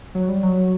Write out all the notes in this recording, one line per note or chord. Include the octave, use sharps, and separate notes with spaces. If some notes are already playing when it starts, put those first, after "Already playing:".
F#3
G3
F#3